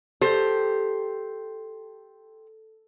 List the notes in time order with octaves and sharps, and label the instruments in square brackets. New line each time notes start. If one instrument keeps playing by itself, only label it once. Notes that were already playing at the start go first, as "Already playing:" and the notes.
[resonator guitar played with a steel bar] G4 C5 [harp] A4